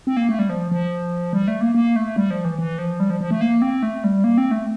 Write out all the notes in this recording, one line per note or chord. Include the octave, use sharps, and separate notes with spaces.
C4
A#3
A3
G3
F3
F3
G3
A3
A#3
A#3
A3
G3
F3
E3
E3
F3
G3
F3
F3
A3
A#3
C4
A3
G3
A#3
C4
A3